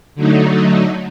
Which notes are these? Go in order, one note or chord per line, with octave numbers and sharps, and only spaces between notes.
D3 F#3 A3 D#4